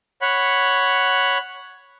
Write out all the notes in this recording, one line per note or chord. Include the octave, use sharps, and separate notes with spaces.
C#5 F#5 B5